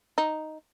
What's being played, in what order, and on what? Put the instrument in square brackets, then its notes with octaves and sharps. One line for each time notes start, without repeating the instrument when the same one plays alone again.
[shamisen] D#4